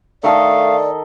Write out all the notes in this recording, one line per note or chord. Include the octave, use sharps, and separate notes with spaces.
D#3 A3 A4 D5 D#5 F5